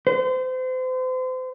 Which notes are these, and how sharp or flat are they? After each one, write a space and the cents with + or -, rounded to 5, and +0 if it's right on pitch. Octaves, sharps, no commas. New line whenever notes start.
C5 -35